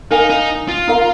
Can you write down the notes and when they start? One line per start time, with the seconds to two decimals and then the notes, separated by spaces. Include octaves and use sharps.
0.11 D#4 A#4 F5 G#5
0.30 D#4
0.68 F4
0.87 D#4 A#4 F5 A#5